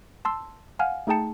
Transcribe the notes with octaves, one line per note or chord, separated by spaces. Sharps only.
A5 C6 E6
F5 F#5 G#5 F6
A3 D#4 G#4 G5 A5 C#7